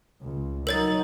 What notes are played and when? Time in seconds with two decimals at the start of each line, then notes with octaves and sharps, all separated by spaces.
0.21 C#2
0.67 F#3 D#4 A#4 C#5 A6